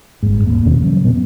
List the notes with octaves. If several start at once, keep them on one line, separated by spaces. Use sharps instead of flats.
G1 G#2
D#1 A#3
E2 B2 D#3 C#4
C#3 F#3
A#2 B3 C4